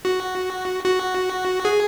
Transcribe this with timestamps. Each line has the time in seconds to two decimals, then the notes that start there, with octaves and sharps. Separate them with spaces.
0.05 F#4
0.84 F#4
1.65 G#4